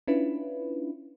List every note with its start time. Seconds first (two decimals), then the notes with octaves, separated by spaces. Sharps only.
0.08 C#4 D4 E4 F4 B4